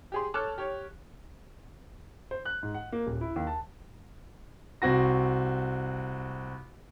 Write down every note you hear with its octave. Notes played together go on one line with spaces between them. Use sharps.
G4 G#4 C6
A4 C#5 A5 D6 F6 F#6
G4 C#5
C5
F#6
G#2
F#5
A#3
D#1
E4
D#2
A5
C2 C4 F#4 A#6